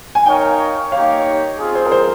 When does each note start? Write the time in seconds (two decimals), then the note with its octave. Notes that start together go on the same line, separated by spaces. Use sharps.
0.15 G#5
0.25 D#4 A#4 C#5 F5 G5
0.92 A#3 D#4 G4 C#5 F5
1.58 C4 F4 G#4
1.75 C5
1.86 A#4
1.92 C5